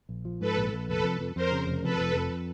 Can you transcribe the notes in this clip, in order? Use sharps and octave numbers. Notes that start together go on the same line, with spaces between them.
A#1
F3
G#2 A4 B4
A#1
A#1
F1 A4 B4
F2
F2
F2 A#4 C5
C#3
F1
F2 A4 B4
F1
F2